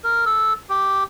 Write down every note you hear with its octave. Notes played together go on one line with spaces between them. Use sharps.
A#4
A4
G4